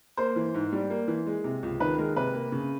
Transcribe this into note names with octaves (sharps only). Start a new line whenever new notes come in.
A#3 C5
E3
G#2
G3
A#3
E3
G#3
C3
C#2
D#3 B4
G#3 A#4
C3 B4
A#3
C#3